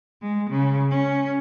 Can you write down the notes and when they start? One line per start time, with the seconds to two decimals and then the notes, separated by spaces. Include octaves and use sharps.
0.22 G#3
0.50 C#3
0.91 C#4